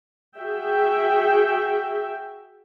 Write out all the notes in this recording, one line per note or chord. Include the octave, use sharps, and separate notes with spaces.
F#4 G#4 E5 G5